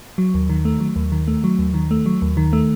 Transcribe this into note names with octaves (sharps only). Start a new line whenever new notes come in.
F#3
D#2
D#3
A3
F#3
D#2
D#3
A3
F#3
D#2
D#3
A3
F#3
D#2
D#3
A3